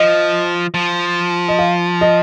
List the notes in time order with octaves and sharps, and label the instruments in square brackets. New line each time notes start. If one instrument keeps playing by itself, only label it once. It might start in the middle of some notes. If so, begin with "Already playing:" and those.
Already playing: [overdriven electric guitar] F3 [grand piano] D#5
[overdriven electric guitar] F3
[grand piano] D#5
F5
D#5